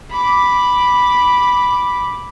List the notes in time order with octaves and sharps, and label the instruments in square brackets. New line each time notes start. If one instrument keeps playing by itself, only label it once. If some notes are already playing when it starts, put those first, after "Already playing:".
[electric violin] B5 D6